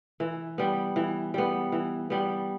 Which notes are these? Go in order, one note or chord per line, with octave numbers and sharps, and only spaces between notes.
E3
G3 B3
E3
G3 B3
E3
G3 B3